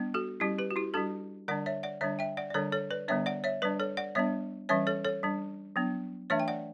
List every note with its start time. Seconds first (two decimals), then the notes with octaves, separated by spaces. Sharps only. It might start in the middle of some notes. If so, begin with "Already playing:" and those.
Already playing: G3 B3 D4
0.14 F#4 A4
0.40 G3 C#4 E4 G4
0.59 G4 B4
0.71 F#4
0.76 E4 G4
0.94 G3 D4 F#4 A4
1.48 D3 G3 D4 D5 F#5
1.66 C#5 E5
1.83 D5 F#5
2.01 D3 G3 D4 C#5 E5
2.19 E5 G5
2.37 D5 F#5
2.50 D5
2.54 D3 G3 D4 A4 C#5
2.72 A4 C#5
2.90 B4 D5
3.08 D3 G3 B3 D4 C#5 E5
3.26 D5 F#5
3.44 C#5 E5
3.62 G3 D4 B4 D5
3.80 A4 C#5
3.97 D5 F#5
4.15 G3 B3 D4 C#5 E5
4.69 E3 G3 C#4 C#5 E5
4.87 A4 C#5
5.05 A4 C#5
5.23 G3 D4
5.76 F#3 B3 D4
6.30 E3 A3 D4 C#5 E5
6.40 G5
6.48 D5 F#5